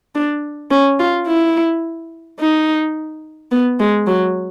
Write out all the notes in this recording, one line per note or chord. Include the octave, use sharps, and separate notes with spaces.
D4
C#4
F4
E4
D#4
B3
G#3
F#3